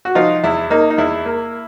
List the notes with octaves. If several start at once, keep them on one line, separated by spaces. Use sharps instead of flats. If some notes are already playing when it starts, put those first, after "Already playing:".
F#4
F3 D#4 F4
E2 E4
A#3 D#4
D#4
E2 E4
A#3